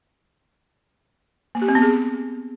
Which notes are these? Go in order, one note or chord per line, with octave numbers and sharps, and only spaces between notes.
A#3
G4
C4
B3
G#4